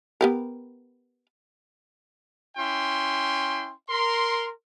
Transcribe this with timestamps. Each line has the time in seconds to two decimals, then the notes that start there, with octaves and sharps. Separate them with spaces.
0.21 B3 G4 A#4
2.57 C#4 E4 G5 C6
3.89 A#4 C6